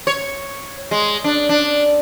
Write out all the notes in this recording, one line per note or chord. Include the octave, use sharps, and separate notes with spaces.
C#5
G#3
D4
D4